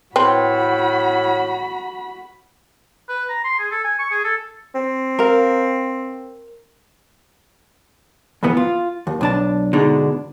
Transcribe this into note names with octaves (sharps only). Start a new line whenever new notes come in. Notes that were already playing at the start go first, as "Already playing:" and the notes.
A2 C4 F#4 B4 B5
B4
A#5
C6
G#4
A4
G#5
C#6
G#4
A4
C4
A#4 F5
F2 G#2 E3 B3
F4
D#2
B1 D4 A5
G#2 B2 D3 G#3 D4 D#4